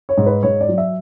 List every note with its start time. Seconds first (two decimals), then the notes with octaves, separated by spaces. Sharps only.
0.09 C#5
0.18 G#2
0.26 B4
0.43 G#2 C#5
0.61 D5
0.69 F#3
0.78 E5